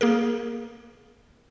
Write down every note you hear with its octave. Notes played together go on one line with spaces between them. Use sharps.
A#3 G#4 A#4